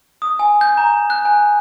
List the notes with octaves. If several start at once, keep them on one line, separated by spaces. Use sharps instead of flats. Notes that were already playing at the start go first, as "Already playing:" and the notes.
D#6
G#5
G6
A#5
F#6
G#5